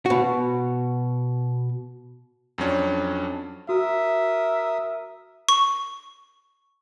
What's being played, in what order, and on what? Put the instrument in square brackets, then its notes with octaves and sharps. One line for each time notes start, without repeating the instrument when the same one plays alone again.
[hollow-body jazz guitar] B2 F#4
[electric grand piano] F2 F#3 C#4 D4
[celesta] F#4 [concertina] A#4 D#6 [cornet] E5
[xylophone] C#6